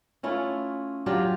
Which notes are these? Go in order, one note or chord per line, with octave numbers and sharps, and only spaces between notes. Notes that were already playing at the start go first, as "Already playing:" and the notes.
A3 C#4 E4 F4
F#3 D4 F4 G4